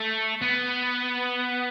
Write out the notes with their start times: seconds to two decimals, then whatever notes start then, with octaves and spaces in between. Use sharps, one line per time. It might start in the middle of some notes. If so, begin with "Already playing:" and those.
Already playing: A3
0.42 B3